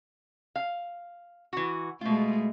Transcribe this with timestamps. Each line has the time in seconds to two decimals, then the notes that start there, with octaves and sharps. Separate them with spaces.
0.56 F5
1.53 E3 F#4
2.01 B2 G#3 A3 F4